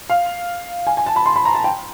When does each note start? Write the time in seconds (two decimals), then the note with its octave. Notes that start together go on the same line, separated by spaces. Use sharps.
0.09 F5
0.87 G#5
0.97 G#5
1.06 A5
1.16 B5
1.26 C6
1.36 B5
1.45 A#5
1.55 A5
1.64 G5